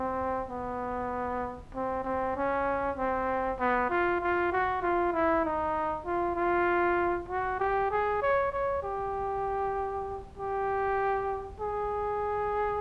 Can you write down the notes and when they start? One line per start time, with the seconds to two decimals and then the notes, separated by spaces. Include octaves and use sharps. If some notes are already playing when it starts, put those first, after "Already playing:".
Already playing: C4
0.50 B3
1.75 C4
2.04 C4
2.36 C#4
2.97 C4
3.59 B3
3.90 F4
4.21 F4
4.52 F#4
4.82 F4
5.13 E4
5.45 D#4
6.06 F4
6.36 F4
7.29 F#4
7.59 G4
7.91 G#4
8.22 C#5
8.52 C#5
8.83 G4
10.38 G4
11.60 G#4